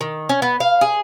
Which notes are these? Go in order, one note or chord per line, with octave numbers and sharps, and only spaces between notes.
D#3
C#4
B3
F5
G#4